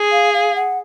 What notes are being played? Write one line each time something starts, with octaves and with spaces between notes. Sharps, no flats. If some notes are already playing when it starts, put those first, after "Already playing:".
Already playing: G#4
F5
F5
F#5